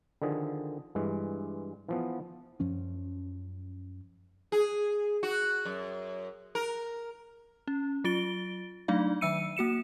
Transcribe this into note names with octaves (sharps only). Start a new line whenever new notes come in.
D3 D#3 F3 G#4
G2 E3 G#3
E3 F3 B3
F#2 F3 C#4
G#4
F#4
F#2
A#4
C#4
F#3 F4 A6 D7 G7
F#3 A3 D4 D#4 D5 F5
D#3 F#3 E5 E6 C#7 D#7
A#3 F#4 C#7 E7